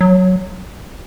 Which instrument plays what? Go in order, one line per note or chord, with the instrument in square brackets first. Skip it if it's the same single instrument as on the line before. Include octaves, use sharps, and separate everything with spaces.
[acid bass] F#3